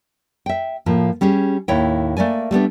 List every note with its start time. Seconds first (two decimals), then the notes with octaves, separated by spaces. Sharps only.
0.46 E5 G5
0.86 A2 F3 A#3
1.21 G3 C#4 G4 G#4
1.68 D#2 A2 E4 C#5 E5 G5
2.17 A3 A#3 D5 G#5
2.51 G3 A3 B3 D4